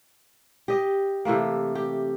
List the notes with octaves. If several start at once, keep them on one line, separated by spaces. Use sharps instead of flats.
G4 D#5
C3 E3 A3 A#3
G4